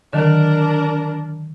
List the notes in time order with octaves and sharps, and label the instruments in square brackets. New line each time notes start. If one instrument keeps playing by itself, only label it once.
[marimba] D3 D#3 F#3 [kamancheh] D4 A#4